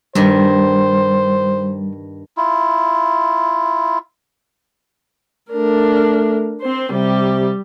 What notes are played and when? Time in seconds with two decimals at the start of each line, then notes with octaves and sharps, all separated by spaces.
0.15 G2 D#3 G3 C5
2.37 E4 F4
5.50 A3 D4 A#4
6.61 C4 C5
6.92 C3 G3 G4